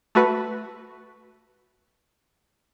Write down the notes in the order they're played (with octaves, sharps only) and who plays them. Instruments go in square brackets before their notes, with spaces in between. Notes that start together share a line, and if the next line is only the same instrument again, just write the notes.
[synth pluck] A3 F#4 B4